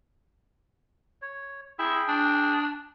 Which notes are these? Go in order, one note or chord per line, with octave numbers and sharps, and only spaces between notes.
C#5
E4 G#4 G5
D4